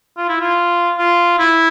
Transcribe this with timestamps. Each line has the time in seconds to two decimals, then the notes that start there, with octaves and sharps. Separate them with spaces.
0.17 F4
0.29 E4
0.41 F4
0.98 F4
1.39 E4